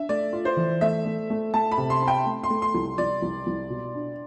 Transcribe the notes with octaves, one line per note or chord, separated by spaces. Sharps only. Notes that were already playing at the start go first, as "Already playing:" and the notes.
Already playing: D4 E5
A3 D5
F4
C5
E3
A3 E5
A3
A3
A3 A5
B5
C3
C6
C4
G5
A3
C6
A3
C6
C2
C2 D5
C2
C2
B2
D4